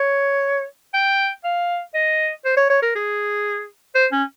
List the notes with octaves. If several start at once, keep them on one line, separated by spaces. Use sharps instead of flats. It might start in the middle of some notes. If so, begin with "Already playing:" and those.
Already playing: C#5
G5
F5
D#5
C5
C#5
C#5
A#4
G#4
C5
C#4